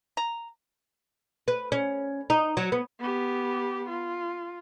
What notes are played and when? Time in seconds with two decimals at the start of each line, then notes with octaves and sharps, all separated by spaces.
0.17 A#5
1.48 B4
1.72 C#4
2.30 D#4
2.57 F#3
2.72 B3
3.00 B3 G4
3.89 F4